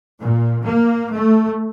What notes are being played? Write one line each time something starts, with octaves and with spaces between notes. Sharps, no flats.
A#2
A#3
A3